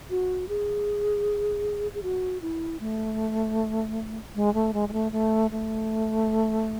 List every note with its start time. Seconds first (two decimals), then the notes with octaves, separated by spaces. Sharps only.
0.10 F#4
0.49 G#4
1.94 G#4
2.03 F#4
2.42 E4
2.80 A3
4.35 G#3
4.54 A3
4.74 G#3
4.89 G#3
4.93 A3
5.12 A3
5.51 A3